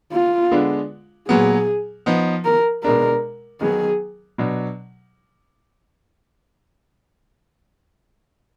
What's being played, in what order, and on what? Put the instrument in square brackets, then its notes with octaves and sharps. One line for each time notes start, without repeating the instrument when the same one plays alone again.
[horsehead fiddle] F4
[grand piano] D3 G#3 B3 D4
[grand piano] A#2 F#3 B3 [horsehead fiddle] G#4
[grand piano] F3 B3 D#4
[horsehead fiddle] A#4
[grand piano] B2 G#3 D4 [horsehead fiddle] A#4
[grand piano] D#3 F#3 B3 [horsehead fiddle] G#4
[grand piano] B2 F#3 D4